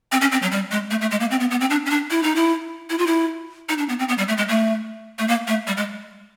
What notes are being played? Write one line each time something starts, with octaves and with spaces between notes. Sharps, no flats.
C4
C#4
C4
F#3
G3
G#3
A3
A3
G#3
A#3
C4
B3
B3
C4
D4
C#4
D4
E4
D#4
E4
E4
F4
E4
D#4
D4
B3
C4
B3
G3
A3
G#3
A3
A3
A#3
A3
G3
G#3